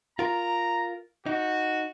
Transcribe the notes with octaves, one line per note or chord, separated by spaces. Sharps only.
F4 A#4 A#5
D#4 F#4